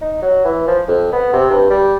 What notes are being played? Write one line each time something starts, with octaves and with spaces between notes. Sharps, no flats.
D#4
F#3
E3
F3
F2
B3
C3
G2
G3